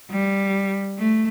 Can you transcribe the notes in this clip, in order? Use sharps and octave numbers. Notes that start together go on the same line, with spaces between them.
G3
A3